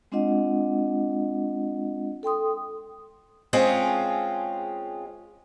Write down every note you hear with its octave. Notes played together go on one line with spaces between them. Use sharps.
G#3 C4 D4 F4 D#5 F#5
A4 G5 C6 D#6
G#3 C4 C#4 F4 G#4